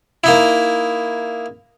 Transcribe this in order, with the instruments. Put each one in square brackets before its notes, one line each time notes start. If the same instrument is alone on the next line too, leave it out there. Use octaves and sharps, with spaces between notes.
[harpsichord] A#3 D#4 E4